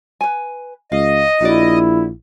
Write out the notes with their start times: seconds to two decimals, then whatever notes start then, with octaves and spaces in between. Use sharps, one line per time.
0.21 B4 G#5
0.92 C#2 D#5 F5
1.41 A#1 D#4 E4 F#4 D5